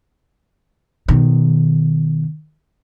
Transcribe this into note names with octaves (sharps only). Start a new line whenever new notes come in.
B2 D#3